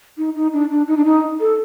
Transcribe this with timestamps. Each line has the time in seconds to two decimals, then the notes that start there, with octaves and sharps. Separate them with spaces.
0.18 D#4
0.35 D#4
0.53 D4
0.70 D4
0.88 D#4
0.97 D4
1.05 D#4
1.40 A4